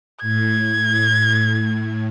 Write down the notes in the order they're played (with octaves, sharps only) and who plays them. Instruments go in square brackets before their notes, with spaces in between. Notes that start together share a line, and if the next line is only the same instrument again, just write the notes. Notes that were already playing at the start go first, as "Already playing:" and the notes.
[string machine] A2 [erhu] G#6